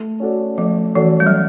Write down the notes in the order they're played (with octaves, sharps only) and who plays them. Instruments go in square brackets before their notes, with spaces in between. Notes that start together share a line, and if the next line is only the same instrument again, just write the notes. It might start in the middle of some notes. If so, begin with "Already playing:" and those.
Already playing: [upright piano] A3
C#4 F#4 A4 D5
[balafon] F3 [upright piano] A3
[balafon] E3 [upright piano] C#4 F#4 A4 D5
[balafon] G3
F#3